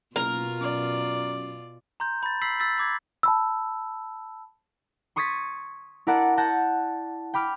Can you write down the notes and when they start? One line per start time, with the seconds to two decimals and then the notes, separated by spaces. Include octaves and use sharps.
0.16 F#1 B2 F4 A#4
0.61 F#2 D5
2.00 A#5 C6 G6
2.23 B5 A6
2.42 B5 E6 B6 C7 F#7
2.60 E6 A6 B6
2.78 B5 D6 G#6
3.23 A5 B5 E6
5.16 C6 C#6 D#6 G#6 A6 B6
6.07 E4 A#4 D5 F#5 A5
6.37 F#5 A5 G6 A#6
7.34 G5 B5 D6 F6